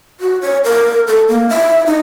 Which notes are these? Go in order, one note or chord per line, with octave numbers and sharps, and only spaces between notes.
F#4
C#5
A#4
A4
A#3
E5
D#4